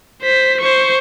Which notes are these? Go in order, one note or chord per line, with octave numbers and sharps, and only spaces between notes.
C5 B6
C5 C#6